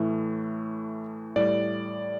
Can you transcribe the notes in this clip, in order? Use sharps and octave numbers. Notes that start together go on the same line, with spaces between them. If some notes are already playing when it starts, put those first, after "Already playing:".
Already playing: A2 E3 A3
A2 G3 D5